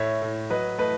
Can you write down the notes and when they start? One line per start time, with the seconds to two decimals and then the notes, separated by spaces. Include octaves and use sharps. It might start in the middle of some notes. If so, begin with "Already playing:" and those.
Already playing: A2 C#5 E5
0.22 A2
0.50 F#3 B4 D#5
0.78 A3 B4 D#5